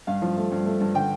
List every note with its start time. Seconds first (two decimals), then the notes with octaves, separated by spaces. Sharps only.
0.07 G2 F5
0.22 F3
0.37 A3
0.52 G2
0.66 A3
0.81 G2
0.94 D3 G5